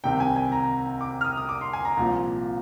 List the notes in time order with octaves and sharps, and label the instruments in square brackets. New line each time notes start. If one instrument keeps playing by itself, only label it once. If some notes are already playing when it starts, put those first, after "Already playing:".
[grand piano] C2 C3 D#3 G5
G#5
G#5
A#5
D6
F6
D#6
D#6
D6
C6
G#5
A#5
C2 A#2 F3